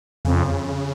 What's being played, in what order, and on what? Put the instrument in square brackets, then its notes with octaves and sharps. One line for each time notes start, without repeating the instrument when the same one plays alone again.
[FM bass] F2 [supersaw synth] C#3